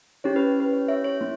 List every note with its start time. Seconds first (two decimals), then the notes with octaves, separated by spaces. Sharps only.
0.24 C#4 E4 G4 C#5
0.36 B4
0.60 B4
0.73 C#5
0.88 C#5 E5
1.04 C#5
1.21 A#3 E4